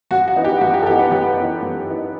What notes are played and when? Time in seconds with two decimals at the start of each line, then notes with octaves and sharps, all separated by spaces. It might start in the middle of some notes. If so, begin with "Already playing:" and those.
0.11 F#2 F#4
0.28 F#4
0.36 E3 B3 D#4
0.44 G4
0.61 F#2 F#4
0.74 G4
0.82 A4
0.87 E3 B3 D#4 G4
0.99 B3 B4
1.11 F#2 G4
1.37 E3 B3 D#4
1.62 F#2
1.88 E3 B3 D#4